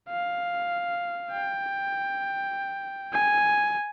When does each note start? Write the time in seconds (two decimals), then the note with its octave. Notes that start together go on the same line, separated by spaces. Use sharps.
0.09 F5
1.31 G5
3.13 G#5